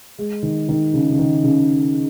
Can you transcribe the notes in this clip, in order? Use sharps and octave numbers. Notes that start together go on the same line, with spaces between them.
G#3
D#3
D#3
C#3
C#3
D#3
C#3